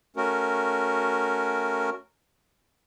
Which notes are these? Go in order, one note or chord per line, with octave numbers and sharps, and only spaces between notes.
A3 C#4 F#4 A#4